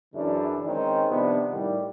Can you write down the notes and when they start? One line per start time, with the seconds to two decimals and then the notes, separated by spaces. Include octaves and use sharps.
0.14 F#2 C#3 E3 D4 E4
0.67 D#3 G#3 C4 C#4 D#4
1.08 C3 F3 B3 D4 D#4
1.52 A2 D#3 G3